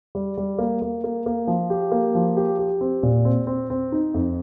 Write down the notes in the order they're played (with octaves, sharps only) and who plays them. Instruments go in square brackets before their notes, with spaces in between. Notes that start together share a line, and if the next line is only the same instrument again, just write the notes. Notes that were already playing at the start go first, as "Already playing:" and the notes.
[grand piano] G3
G3
A#3
A#3
A#3
A#3
F3
G4
A#3
F3
G4
G4
C4
A#2
C4
C4
C4
D#4
F2